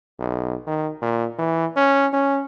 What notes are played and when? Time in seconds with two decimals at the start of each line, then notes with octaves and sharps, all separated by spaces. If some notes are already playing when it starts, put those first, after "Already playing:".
0.19 B1
0.67 D#3
1.02 A#2
1.38 E3
1.76 C#4
2.13 C#4